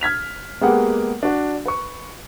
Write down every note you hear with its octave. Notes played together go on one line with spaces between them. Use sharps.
F6 G#6 B6 F7
G#3 A#3 B3 G4 G#4 F#5
D4 F#4
B4 C#6